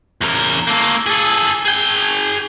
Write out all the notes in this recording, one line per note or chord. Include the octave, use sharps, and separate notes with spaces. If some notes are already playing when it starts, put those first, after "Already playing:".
E2 A#4
A#3 A4
G#4 A4
G#4 G5